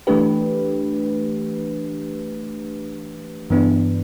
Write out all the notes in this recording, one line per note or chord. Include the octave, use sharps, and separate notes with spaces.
E3 A3 D4 G4 B4
G2 E3 B3 D4